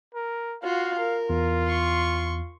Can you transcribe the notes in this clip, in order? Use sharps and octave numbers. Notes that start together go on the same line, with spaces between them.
A#4
F4 F#4 F5
A#4
E2 F4
C6 C#6